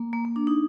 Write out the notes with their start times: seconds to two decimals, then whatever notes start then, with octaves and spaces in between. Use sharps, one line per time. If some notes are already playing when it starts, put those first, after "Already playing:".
Already playing: A#3
0.13 A#3
0.25 A#3
0.36 D4
0.47 D#4